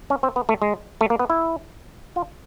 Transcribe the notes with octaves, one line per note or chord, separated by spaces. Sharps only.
C#4
C4
B3
A3
G#3
A3
A#3
B3
E4
F4